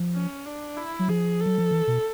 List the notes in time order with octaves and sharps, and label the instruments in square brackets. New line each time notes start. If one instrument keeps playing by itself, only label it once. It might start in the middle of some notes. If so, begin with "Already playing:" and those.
Already playing: [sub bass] F3
[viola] C#4
D4
E4
[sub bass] F#3
[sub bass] F3 [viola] G#4
[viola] A4
[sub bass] F#3
F3
E3
B2